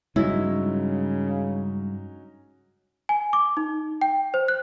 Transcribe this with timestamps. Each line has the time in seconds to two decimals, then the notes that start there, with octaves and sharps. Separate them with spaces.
0.16 G2 C#3 F#3 G#3 C#4 D#4 E4
3.09 G#5
3.33 D6
3.57 D#4
4.01 G5
4.34 C5
4.48 F#6